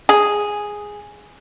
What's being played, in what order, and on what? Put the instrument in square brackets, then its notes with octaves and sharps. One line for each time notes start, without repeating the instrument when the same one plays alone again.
[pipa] G#4